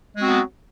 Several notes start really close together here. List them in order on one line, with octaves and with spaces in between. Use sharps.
G#3 F#4 C4 F#3 B3